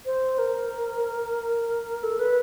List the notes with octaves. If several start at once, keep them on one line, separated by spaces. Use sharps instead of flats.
C5
A#4
A4
B4